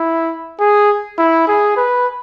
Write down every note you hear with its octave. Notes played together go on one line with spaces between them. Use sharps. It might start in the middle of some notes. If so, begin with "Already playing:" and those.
Already playing: E4
G#4
E4
G#4
B4